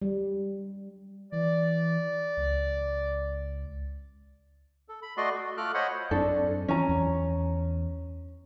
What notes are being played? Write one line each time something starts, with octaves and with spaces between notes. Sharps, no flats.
G3
E3 D5
C#2
A4
B5
A3 F#4 D5 D#5 C6
F#4
A3 F4 A4 D6 F6 F#6
C5 C#5 D#5 F#5 B5
F#2 C4 D4 A4
E3 F3 C#4 A#5
E2